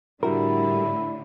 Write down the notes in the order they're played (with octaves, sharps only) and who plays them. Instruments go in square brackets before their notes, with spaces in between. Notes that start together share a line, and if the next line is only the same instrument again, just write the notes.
[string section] A2 D3 [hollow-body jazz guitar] G3 F#4 A#4 [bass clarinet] E4